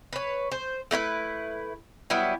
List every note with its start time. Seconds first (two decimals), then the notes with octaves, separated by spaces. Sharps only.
0.13 B4 C#5
0.52 C5
0.91 A3 E4 F4 B4
2.10 F#3 G3 B3 E4